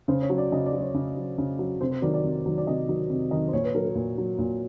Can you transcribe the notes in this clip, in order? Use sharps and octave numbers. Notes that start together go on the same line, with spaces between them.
C#3 C5
C#5
F#3
D5
C#3 D#5
D5
F#3
C#5
C#3
F#3
C#3
F#3
C3 C5
C5
D#3 F#3 D5
D5
C3
D#3 F#3
D5
C3 D#5
D#3 F#3
C3
D#3 F#3 D#5
C5
A#2 C#5
B4
F#3 A#4
A#4
A#2
F#3
A#2